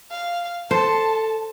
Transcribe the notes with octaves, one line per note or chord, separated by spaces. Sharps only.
F5
A4 C5 A5